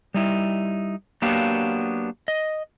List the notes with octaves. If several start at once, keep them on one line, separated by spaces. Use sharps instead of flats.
G3 D#4 E4
F#3 A#3 B3 D4 G4 F5
D#5